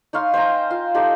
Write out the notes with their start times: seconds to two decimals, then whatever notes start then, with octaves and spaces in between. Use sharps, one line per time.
0.13 D#4 C#5 F5 C6
0.34 C5 G5 G#5 A#5
0.70 F4 F5
0.94 D#4 G4 A4 C5